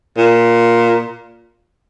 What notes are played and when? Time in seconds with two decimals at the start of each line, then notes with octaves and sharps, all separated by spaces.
0.18 A#2